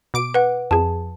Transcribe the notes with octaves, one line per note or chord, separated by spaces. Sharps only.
B2 D6 D7
B4 F#5
F2 G#4 A5